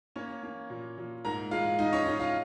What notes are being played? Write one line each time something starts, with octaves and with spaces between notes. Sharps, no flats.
A#3 C#4 C#5
A#3
A#2
A#2
G#2 A#4 A#5
G#3 F4 F5
G#2 D#4 D#5
C#4 C#5
G#3 D#4 D#5
F4 F5